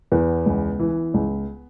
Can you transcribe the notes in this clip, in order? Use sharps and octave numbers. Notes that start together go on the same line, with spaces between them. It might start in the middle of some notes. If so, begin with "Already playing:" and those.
E2 B3
C#2
E3
C#2